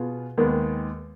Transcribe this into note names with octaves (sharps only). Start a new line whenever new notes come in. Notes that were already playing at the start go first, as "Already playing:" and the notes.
Already playing: B2 B3 F4 G#4
D#2 D#3 G#3 B3